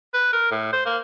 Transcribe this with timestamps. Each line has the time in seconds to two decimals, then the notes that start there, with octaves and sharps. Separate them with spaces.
0.14 B4
0.33 A#4
0.51 A2
0.73 C5
0.86 A#3